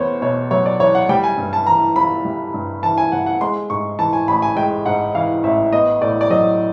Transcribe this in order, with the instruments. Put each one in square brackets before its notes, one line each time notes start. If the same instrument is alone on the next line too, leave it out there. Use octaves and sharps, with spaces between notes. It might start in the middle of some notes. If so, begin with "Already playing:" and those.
Already playing: [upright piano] E2 B3 C5 C#5
B2 C#5
F#3 C#5
D5
E2 C#5
F#5
G3 G5
G#5
G2
A5
E3 A#5
G1 B5
G3
G2
E3 A5
G#5
G1 F#5
F#5
G#3 C6
G#2 C#6
E3 A5
G#5
A1 B5
G#5
G#3 G5
G#2 F#5
E3 F5
A1 E5
B3 D#5
A2 D5
D5
F#3 D#5